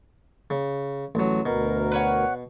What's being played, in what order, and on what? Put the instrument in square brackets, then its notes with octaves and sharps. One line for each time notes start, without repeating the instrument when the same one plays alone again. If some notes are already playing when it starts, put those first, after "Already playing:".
[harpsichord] C#3
A1 F#3
[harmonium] D2 A#4 [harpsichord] B2
[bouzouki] B4 C#5 F#5